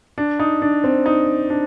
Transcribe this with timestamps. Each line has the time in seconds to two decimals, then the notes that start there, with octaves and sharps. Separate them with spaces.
0.18 D4
0.39 D#4
0.62 D4
0.84 C4
1.06 D#4
1.50 D4